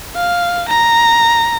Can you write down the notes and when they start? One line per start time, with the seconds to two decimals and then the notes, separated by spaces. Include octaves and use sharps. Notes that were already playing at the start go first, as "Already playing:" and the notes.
0.16 F5
0.69 A#5